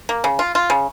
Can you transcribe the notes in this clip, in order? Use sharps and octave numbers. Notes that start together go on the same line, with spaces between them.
A#3
C#3
F4
F4
C#3